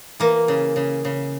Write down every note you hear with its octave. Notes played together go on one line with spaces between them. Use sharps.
E3 A#3
C#3
C#3
C#3